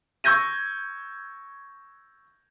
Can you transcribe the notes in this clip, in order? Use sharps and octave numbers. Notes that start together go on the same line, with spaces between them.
C#6 E6 G6 G#6 A#6 D#7